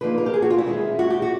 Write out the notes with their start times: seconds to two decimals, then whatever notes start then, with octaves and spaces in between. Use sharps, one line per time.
0.01 D3 F3 A#3 D#4 B4
0.18 A#4
0.26 G4
0.34 G#4
0.42 F#4
0.50 F4
0.58 E4
0.66 D#3 G#3 C#4
0.99 F#4
1.10 G4
1.22 F#4